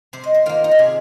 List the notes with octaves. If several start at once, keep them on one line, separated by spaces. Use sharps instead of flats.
C3 C5
D#5
C5
D#3 A#3 F4
D#4
F4
C3 G#4